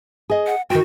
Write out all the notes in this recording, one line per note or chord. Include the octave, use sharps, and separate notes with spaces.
G#4 D#5
F#5
D#3 F#4 G5